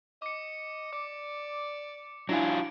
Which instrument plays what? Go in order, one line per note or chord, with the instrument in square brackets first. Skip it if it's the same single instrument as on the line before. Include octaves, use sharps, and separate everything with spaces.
[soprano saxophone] D#5 [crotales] D6 C#7
[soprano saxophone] D5 [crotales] D6
[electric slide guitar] F#3 F4 [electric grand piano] D4 E4 G#5 [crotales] D7